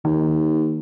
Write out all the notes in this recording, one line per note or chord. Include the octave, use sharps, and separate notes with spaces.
D#2 D#3